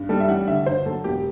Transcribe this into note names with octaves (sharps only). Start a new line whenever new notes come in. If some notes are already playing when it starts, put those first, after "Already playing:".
Already playing: G2
G3 A4
E5
A1 F#5
D3 E5
G2 C5
F#3 A4
E1 G4